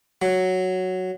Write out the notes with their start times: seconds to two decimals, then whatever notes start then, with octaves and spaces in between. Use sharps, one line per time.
0.22 F#3